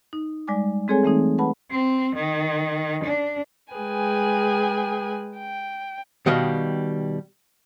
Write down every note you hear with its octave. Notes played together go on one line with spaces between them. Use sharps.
D#4
G3 G#3 D5 G#5 D6
G#3 C4 G#4 A4 C#5 G#5
E3 A3 C4 D#4
B4 F#5 A5 B5
C4
D#3
D4
G#3 G#4 B4 G5 G#5
G5
B2 D#3 G3 D#5 F5